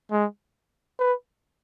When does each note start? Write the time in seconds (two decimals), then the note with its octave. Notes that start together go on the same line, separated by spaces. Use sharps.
0.12 G#3
0.99 B4